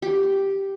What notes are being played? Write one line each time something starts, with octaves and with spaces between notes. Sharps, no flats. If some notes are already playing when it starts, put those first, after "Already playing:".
G4